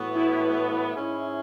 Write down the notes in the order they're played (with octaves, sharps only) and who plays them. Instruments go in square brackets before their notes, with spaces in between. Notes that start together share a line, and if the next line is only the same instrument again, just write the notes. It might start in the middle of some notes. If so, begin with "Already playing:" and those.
Already playing: [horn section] A2 E3 B3 F#4
[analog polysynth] E4
[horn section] G#2 G#3 C#4 G#4